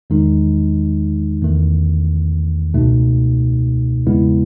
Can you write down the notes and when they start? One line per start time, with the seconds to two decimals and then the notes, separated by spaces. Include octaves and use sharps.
0.10 E2 D#3 G#3 D#4
1.42 E2 D#3 A3
2.74 C#2 B2 A3 D#4
4.06 E2 C#3 G#3 B3 E4